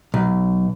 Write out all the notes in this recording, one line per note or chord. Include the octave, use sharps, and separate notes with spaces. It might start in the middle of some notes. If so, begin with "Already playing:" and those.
B1